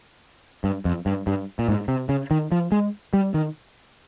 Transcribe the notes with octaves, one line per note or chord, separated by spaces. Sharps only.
G2
F2
G2
G2
A#2
G#2
C3
C#3
D#3
F3
G#3
G3
D#3